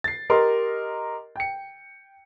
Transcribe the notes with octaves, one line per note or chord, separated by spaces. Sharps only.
A6 C7
G4 A#4 D#5 C6
G5 C#7